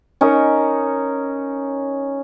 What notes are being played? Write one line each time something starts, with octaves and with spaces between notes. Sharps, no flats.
C#4 D#4 A#4